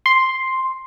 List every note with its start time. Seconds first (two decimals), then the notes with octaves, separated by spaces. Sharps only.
0.06 C6